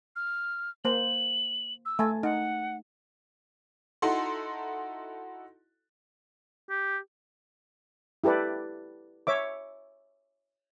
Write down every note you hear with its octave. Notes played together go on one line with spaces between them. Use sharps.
F6
A#3 C5 F#7
E6
A3 G#5 A5
D#4 F#5
D#4 E4 F#4 A4 C6
G4
E4 G4 A4 B4 D5
C#5 E5 D6